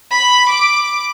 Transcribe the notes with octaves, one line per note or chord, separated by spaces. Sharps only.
B5
D6